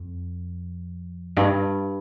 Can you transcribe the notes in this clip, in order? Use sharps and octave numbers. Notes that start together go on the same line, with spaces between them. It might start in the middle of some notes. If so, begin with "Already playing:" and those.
Already playing: F2
G2